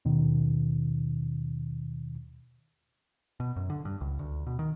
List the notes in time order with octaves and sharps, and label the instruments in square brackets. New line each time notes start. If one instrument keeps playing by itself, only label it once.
[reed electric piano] D#2 B2 D#3
[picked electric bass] B2
F#2
D3
G2
C#2
D2
B2
D#3